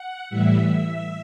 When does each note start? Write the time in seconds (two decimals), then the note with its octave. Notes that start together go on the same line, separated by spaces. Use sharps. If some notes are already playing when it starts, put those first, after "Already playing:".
Already playing: F#5
0.29 A2 E3 G3 E5